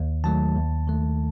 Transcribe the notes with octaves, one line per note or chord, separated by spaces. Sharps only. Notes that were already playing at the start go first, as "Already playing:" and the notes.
Already playing: D#2
D#3 F#3 A3 A5
D#2
D#3 A3